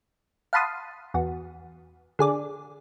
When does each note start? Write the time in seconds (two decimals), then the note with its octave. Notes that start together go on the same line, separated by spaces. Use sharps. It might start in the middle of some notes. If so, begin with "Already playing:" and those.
0.53 F5 F#5 A5 B5 C6 D#6
1.14 E2 F#4
2.19 D3 G#4 D5